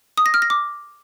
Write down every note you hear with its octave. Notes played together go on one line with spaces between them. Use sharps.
D#6
A#6
F6
A#6
D6